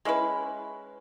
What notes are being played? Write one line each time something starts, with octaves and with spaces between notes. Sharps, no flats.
G#3 C#4 E4 B4